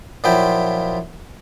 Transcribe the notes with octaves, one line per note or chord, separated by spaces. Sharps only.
A#2 F3 F#3 E4 G5